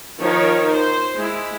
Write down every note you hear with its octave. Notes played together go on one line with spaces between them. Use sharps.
D#3 F3 D#4 A#4 C#5
C5
G#3 E4